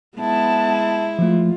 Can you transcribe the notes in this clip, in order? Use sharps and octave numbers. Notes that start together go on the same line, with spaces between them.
G#3 B3 E4 A5
F3 A3 F4